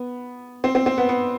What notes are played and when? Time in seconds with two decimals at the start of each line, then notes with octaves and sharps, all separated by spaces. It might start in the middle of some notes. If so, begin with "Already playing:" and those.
Already playing: B3
0.64 C4
0.75 C4
0.86 C4
0.98 B3
1.09 B3